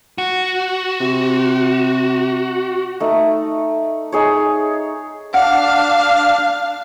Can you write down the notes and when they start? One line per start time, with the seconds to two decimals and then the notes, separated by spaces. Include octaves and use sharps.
0.18 F#4
1.01 C3
3.00 A3 D#4
4.12 D#4 G#4 C#5
5.34 D4 F5 F#5